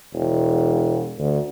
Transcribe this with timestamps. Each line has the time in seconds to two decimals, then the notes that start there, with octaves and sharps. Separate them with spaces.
0.13 E1
1.19 D2